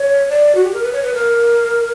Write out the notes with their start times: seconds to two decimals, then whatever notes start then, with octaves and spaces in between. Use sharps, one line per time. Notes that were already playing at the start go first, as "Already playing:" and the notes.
Already playing: C#5
0.30 D5
0.55 F#4
0.64 G4
0.73 A#4
0.83 B4
0.92 C#5
1.03 B4
1.14 A#4